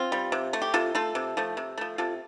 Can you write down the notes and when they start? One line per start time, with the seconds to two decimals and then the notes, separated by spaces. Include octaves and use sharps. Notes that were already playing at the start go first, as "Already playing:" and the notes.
Already playing: C4 F4
0.12 G3
0.32 C3
0.53 A3
0.62 G4
0.74 C3 F4 A4
0.95 A3 F4 A4
1.15 C3
1.37 F3 A3
1.57 C3
1.78 F3 A3
1.98 C3 F4 A4